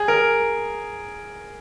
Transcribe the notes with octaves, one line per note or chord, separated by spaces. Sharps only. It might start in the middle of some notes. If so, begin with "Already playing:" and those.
Already playing: G#4
A#4